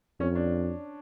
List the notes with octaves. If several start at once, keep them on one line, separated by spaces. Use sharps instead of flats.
F2 C#4
D4